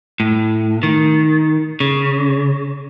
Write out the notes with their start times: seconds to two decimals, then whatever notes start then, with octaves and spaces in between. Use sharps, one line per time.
0.20 A2
0.83 D#3
1.80 C#3